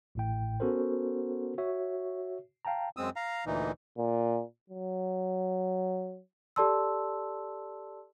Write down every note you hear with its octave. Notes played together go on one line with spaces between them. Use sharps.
A1 A2 G5
B3 C#4 F#4 A4 A#4 C5
F#4 C#5 E5
F5 G5 A5 A#5
F#2 G#3 C4 D#6 E6
F5 A#5
D2 A#2 E3 D#4
A#2
F#3
G4 A4 D5 A5 C6 E6